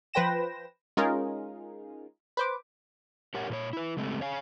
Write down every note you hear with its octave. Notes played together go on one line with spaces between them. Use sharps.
F3 B4 C5 G5 A#6 E7
G#3 C#4 D#4 F4 G#4 A#4
B4 C5 D6
G4 A#4 C#5 F#5
A#2 A#4 C#5
E4 B4
C#3 G#3 A3 C4 G4
C#5 F5 G#5